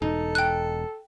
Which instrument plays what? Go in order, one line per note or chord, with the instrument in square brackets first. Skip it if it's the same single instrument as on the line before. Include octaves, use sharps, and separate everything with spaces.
[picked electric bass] E1 [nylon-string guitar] D#4 [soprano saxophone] A4
[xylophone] G5 F#6